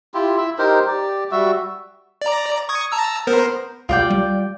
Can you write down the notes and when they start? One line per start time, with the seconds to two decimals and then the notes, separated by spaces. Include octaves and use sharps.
0.14 E4 F4 G4
0.37 E4 E5
0.58 D#4 G4 A#4 C5
0.88 G4 D5
1.31 G3 F#4 E5
2.22 D5 A#5
2.69 C#6 D#6 G#6
2.92 A5 A#5 E6
3.27 B3 A#4 C5
3.89 C2 F4 D5 G5
4.10 G3